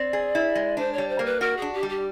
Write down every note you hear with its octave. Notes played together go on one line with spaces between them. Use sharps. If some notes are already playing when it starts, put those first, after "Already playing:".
Already playing: C4 D5
G#4
E4
G#3
D4 C5
C#5
G3
C5
A#3
B4
F#4 A#4
G#4
D4
G4
G3
G4